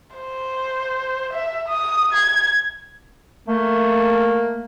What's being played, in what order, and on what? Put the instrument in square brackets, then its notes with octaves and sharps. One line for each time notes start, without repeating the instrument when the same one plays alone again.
[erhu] C5
E5
D#6
G#6
[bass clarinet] A3 [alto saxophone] A#3